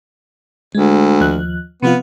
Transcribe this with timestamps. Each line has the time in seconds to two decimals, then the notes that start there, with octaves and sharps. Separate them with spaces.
0.75 D2 G#3
1.20 D#2 F3 F#6
1.82 C3 F3 B3 F4